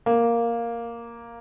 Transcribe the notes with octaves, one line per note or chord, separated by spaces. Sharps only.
A#3